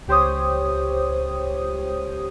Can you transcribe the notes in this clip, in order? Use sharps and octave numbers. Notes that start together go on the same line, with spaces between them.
C#2 G4 C5 C#5 D#6